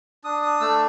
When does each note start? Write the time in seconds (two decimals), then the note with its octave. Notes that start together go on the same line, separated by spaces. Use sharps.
0.24 D4 D#6
0.42 D#6
0.61 A3 E6